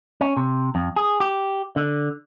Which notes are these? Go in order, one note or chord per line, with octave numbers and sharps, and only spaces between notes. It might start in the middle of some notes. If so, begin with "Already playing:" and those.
C#4
C3
F2
G#4
G4
D3